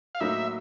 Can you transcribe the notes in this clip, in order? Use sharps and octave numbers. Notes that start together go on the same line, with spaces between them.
F5
A2 F#3 A#3 D#4 E5